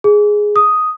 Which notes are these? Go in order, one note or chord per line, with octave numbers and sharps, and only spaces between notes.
G#4
D#6